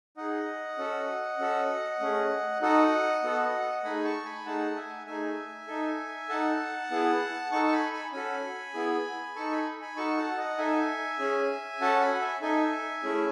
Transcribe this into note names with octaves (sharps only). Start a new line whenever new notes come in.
D#4 G#4 D#5 F#5
C#4 F#4 A4
C#4 F#4 A4
A3 C#4 G#4
D#4 F#4 A4 D#5 F#5
B3 F#4 A4
A3 D#4 G#4 G#5 B5
A5 C#6
G#5 B5
A3 D#4 G#4 F#5 A5
E5 G#5
A3 D#4 G#4 E5 G#5
D#4 A4
D#4 A4 F#5 A5
B3 E4 G#4
D#4 A4 A5 C#6
C#6
G#5 B5
G#5 B5
C#4 F#4 A4 G#5 B5
B3 E4 G#4
D#4 A4 A5 C#6
G#5 B5
G#5 B5
D#4 F#4 A4 A5 C#6
F#5 A5
D#5 F#5
D#4 A4 E5 G#5
C#4 G#4
C#4 F#4 A4 F#5 A5
G#5 B5
E5 G#5
D#4 A4 E5 G#5
A3 C#4 E4 G#4